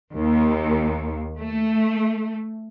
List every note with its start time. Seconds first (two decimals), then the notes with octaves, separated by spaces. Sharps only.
0.15 D#2
1.37 A3